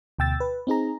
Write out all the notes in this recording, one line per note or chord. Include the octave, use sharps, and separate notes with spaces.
D2 B2 G5 E6 A6
B4
C4 D#4 G#4 A#5